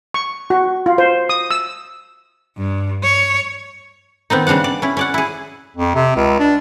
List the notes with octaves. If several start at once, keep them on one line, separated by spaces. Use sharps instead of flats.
C#6
F#4
F4
C5
D#6
E6
G2
C#5
D#3 B3 C4 D#4
C#3 G3 D4 F5 F#5
D5
C#4 E4
C#4 D5 F#5
E4 G#4
F2
C3
C#2
D4